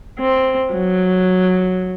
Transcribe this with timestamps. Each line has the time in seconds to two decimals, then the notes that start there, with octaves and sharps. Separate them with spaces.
0.19 C4
0.73 F#3